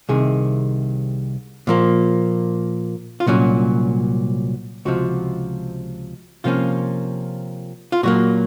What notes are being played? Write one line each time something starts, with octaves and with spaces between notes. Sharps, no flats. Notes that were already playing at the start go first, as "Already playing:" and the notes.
C2 C3 D#3 G#4
A#2 F3 A#3
F4
C2 A#2 F#3 C#4 F#4
C#2 C3 F3 F#4
C3 F3 A#3 C#4 F4
F4
A#2 F#3 A#3 F#4